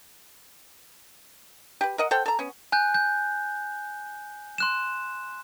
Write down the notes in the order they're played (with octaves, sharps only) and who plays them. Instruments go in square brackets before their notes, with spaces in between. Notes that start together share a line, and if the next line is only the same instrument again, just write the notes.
[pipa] G4 B4
A#4 D#5 F#5
A4 C5 F#5 G5
A4 A#5
B3 C#4
[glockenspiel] G#5 F#6 G6
G6
C6 F#6 E7